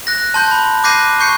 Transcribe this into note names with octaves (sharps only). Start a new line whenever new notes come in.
F#6 A#6
A5 C6 G6
B5
D6 F#6 G6 A#6 C7 D#7
C#6 G6 C7 C#7